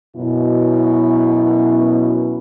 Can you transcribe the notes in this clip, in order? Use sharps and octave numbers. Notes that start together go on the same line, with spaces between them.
F#2 B2 E4